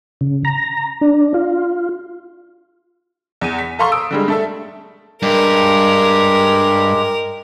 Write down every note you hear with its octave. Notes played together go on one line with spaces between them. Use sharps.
C#3
A#5
D4
F4
E2 D#7
B6
A4 F5 A#5 C6 C#6
D#6 E6 D7
D3 G3 G#3
A3 A4 E5
G2 G#3 G4 A#4